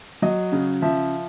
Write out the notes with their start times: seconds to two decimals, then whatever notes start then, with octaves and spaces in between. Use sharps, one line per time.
0.22 F#3 D#5
0.52 C#3
0.82 F3 E5